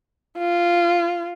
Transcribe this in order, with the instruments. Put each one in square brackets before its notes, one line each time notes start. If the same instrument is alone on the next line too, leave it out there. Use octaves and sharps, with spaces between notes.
[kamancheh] F4